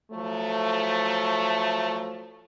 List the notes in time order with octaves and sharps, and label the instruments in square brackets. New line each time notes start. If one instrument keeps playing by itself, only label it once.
[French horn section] F3 F#3 A3